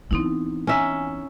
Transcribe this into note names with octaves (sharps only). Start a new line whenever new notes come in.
E3 B3 C4 D#4 E4
C#4 E5 G#5 A#5